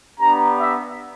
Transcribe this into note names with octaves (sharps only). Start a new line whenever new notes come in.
B3 D4 G4 A#5
E5